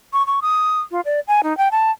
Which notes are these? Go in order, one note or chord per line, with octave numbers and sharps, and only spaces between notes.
C#6
C#6
D#6
F4
D5
G#5
D#4
G5
A5